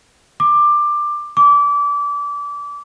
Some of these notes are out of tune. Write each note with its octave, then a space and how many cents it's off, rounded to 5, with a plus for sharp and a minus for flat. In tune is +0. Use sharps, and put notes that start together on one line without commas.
D6 +15
D6 -25